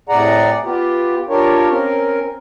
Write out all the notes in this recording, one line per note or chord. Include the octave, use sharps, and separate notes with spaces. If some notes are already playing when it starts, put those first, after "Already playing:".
A2 C3 G#4 D5 F#5 A#5
B3 F4 G4
D4 F4 G4 A#4 C#5
C4 C#4 A#4